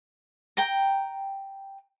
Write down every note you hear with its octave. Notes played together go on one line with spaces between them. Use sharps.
G5 A#5